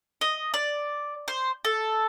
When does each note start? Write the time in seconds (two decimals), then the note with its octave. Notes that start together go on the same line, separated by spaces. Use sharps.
0.21 D#5
0.54 D5
1.28 C5
1.65 A4